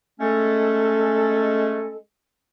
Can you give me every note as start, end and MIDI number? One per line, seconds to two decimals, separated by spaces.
0.20 1.96 56
0.20 1.96 57
0.20 1.96 61
0.20 1.96 69